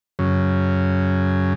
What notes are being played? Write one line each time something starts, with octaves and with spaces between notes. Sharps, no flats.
F#2 C#3